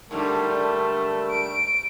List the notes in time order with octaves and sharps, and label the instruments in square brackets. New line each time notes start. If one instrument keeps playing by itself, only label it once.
[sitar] G#2 D3 G3 [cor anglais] A3 [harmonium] A#4
[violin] D7